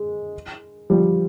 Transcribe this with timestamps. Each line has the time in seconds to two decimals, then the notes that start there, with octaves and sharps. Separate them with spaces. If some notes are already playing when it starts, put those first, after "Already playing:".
Already playing: G#3
0.90 F3 G3